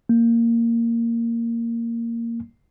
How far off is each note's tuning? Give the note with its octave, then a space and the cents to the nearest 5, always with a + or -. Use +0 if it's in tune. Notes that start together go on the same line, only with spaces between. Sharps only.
A#3 -10